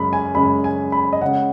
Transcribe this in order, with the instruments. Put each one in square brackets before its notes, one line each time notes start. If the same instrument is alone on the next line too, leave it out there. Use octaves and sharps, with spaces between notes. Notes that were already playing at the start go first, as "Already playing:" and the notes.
Already playing: [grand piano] F#2 C#3 G#3 C#4 B5
G#5
F#2 C#3 G#3 C#4 B5
G#5
B5
D#5
C#3 G#3 C#4 F#5